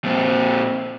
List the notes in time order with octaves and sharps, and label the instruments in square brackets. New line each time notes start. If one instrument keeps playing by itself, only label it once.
[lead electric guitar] A#2 C4